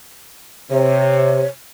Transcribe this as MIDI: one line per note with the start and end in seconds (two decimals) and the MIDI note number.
0.71 1.41 48
0.71 1.46 73